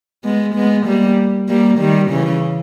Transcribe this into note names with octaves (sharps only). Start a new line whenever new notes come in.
G#3 B3
G#3 B3
G3 A#3
G3 A#3
D#3 G3
C#3 E3